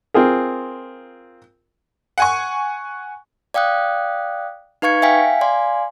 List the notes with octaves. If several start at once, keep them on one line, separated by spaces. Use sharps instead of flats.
C4 F4 G#4 A#4
F#5 G#5 C#6
D5 F5 G5 D#6 F#6
D#4 B4 F5 C#6 G#6 C#7
E5 F5 G5 G#5 B6
D5 F5 G#5 C6